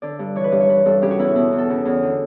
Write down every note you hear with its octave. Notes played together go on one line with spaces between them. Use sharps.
D3 D5
G2
E3 C#5
B4
G2
C#5
E3 B4
G2 A4
C#3 G4
F#4
E2 E4
F#4
B2 E4
E2
A4
C#3
E2
D3